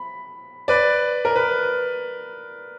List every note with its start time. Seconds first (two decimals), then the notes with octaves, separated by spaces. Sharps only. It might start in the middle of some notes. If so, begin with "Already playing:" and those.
Already playing: B5
0.68 B4 D5
1.25 A#4
1.36 B4